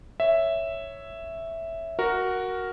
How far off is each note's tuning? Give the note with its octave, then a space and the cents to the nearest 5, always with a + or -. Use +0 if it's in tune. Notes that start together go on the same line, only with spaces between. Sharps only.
C#5 +0 E5 +0
F#4 +0 A#4 +0